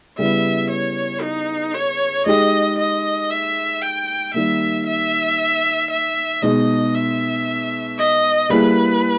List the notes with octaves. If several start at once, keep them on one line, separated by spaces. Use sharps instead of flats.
C#3 G3 B3 E4 E5
C#5
D#4
C#5
G#3 D#4 G4 D#5
D#5
E5
G5
D#3 G3 A#3 E5
E5
E5
B2 G#3 D#4 D#5
E5
D#5
G3 A#3 E4 G#4 B4